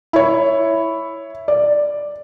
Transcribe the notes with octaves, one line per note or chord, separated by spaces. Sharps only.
E4 C#5
D5